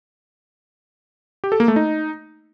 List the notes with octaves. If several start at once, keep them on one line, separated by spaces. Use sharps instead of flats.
G4
A4
A#3
A3
D#4